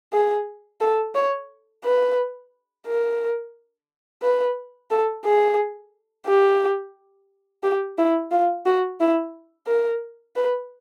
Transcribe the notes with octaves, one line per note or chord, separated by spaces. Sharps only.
G#4
A4
C#5
B4
A#4
B4
A4
G#4
G4
G4
E4
F4
F#4
E4
A#4
B4